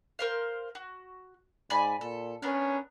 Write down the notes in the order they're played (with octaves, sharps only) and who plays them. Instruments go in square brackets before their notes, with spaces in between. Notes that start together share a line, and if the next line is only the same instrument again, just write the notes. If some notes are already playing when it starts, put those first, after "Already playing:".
[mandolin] A#4 C5 F5
F#4
[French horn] G#2 [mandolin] D5 G#5 B5
[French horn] A#2 [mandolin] A4
[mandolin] B3 D4 A#4 [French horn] C#4